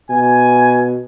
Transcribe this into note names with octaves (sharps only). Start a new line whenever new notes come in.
B2 G#5